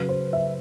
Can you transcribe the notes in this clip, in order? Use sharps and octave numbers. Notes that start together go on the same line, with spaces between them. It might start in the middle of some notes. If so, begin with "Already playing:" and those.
Already playing: C#3 F#3 B4
C5
E5